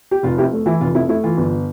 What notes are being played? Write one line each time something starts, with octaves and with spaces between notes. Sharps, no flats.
G4
F1 F4
F2 E4 G4
A3
E3 E4
F1 F4
F2 E4
A3 E4
E3 F4
G1